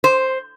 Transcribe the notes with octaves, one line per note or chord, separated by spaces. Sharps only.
C5